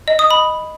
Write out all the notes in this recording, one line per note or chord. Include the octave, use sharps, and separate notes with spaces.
D#5
D#6
B5